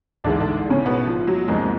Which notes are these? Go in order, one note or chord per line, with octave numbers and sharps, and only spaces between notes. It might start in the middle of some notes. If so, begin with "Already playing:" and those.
A1 G#2 D3 E3 G#3 D4
D3 D4
C#3 C#4
B2 B3
F3
F#3
E2 G#2 C3 F3 G#3 A#3 D4